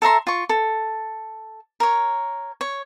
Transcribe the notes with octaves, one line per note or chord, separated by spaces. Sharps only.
A4 E5 A#5 C6
F4 C#6
A4
A#4 C#5
C#5